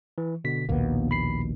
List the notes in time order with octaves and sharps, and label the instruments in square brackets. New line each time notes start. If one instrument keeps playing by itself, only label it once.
[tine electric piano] E3
B2 D3 B6
[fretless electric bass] A#1 D#2 B2 [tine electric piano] A#3 B3
[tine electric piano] B5 C7